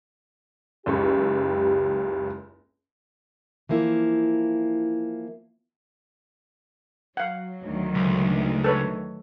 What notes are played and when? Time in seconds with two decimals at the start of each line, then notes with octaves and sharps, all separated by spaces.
0.86 F#1 C#2 G4 C#6
3.69 E3 F3 A#3 E4
7.17 F#3 F5 F#5
7.64 D2 D#3
7.95 C#2
8.64 A4 B4 C#5